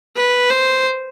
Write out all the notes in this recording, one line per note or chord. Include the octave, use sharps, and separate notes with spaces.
B4
C5